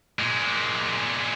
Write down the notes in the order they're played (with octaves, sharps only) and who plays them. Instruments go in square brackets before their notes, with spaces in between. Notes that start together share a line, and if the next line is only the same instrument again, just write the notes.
[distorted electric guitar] A#2 G#3